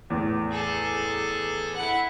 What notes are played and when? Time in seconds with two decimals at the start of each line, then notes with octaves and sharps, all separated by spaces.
0.10 E2 A2
0.51 G#4 A4
1.76 E4 F#5